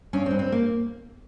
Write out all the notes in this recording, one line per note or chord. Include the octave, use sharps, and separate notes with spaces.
G2 C#4
C4
G2
C4
A#3